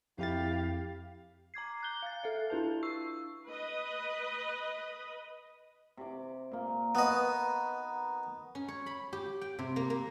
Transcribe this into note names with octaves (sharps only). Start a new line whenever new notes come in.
F2 E4 G4 F5 A6
A#5 D6 G#6 C7
F#6 G6 G7
F5 F#6 A6
A4 E5 F5
D4 E4 B4 A5
C#6 E6 C7
B4 D#5
C3 D6
A#2 A#3
B3 D#4 F#4 B4 D#5
C#4
C#5
B5
G4
G5
C3
A#3
A#3